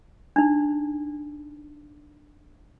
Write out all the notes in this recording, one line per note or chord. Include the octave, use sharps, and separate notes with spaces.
D4 D#4